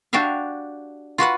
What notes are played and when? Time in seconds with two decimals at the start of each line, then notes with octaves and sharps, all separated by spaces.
0.13 D4 F#4 G4 E5 F5
1.18 F4 F#4 B4 F#5